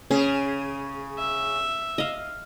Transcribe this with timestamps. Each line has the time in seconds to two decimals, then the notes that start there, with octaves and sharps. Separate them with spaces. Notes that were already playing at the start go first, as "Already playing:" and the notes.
0.10 C#3 C#4 G#4
1.18 E5
1.98 D#5 F5